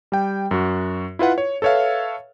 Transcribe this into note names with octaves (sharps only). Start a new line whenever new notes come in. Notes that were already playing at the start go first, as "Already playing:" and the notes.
G3 G5
F#2 F#4
E4 F4 B4 F#5
C#5
A4 B4 C#5 E5 F5